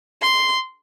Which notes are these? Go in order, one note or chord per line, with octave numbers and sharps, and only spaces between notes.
C6